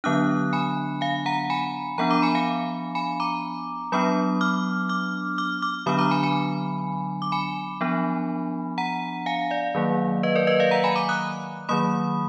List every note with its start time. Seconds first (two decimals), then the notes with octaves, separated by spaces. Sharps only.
0.04 D3 F#3 B3 D4 D#6 F#6
0.53 G#5 B5
1.01 F5 G#5
1.26 F#5 A#5
1.50 G#5 B5
1.98 F3 B3 D4 F#5 A#5
2.10 A#5 D6
2.22 G#5 B5
2.35 F5 G#5
2.95 G#5 B5
3.20 A#5 D6
3.92 F#3 B3 D4 B5 D#6
4.41 D6 F6
4.89 D6 F6
5.38 D6 F6
5.62 D6 F6
5.86 D3 F#3 B3 D4 B5 D#6
5.99 A#5 D6
6.11 G#5 B5
6.23 G#5 B5
7.22 D6
7.32 G#5 B5
7.81 F3 B3 D4
8.78 F#5 A#5
9.26 F5 G#5
9.51 D5 F5
9.75 D#3 F#3 A#3
10.23 B4 D#5
10.35 A#4 D5
10.47 B4 D#5
10.60 D5 F5
10.71 F#5 A#5
10.84 G#5 B5
10.96 A#5 D6
11.09 D#6 F#6
11.69 D#3 F#3 A#3 B5 D#6